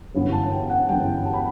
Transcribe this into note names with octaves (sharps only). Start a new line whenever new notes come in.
G1 F#2 E3 B3
A5
G5
F#5
G1 F#2 E3 B3 G5
A5
B5